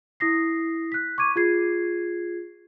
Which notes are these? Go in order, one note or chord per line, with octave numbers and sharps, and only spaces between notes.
E4 D#6 A#6 C7
F#6 B6
C#6 D6 G#6 D#7
F4 G#4 G#6 C7